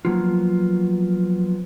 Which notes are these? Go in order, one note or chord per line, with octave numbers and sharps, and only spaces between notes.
F3 F#3 A#3 B3 F4